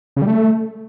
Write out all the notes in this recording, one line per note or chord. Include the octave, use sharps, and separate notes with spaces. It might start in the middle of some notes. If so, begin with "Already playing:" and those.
C#3
G3
A3